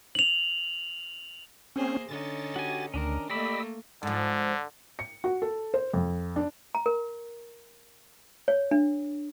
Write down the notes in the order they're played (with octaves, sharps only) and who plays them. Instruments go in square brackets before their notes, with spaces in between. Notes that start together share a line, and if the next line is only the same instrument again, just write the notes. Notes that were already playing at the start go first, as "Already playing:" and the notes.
[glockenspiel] F7 F#7
[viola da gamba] A#3 G#4 C5 [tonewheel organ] C4 C#4
[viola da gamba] D3 C#4 D#4 [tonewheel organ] A6
[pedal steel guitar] F#4 G4 G#5
[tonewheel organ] D2 [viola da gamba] D#3 [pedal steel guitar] C#4 D4 A#4
[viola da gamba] A3 A#3 [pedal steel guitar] G4 D5 B5 [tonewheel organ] D#5 E6
[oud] G#2 F3 [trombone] D3
[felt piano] C#7
F#4
A4
C5
F2
D4
[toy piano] A#5
A#4
C#5
D4